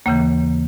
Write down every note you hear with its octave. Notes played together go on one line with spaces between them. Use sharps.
D#2 C#3 E3 A#3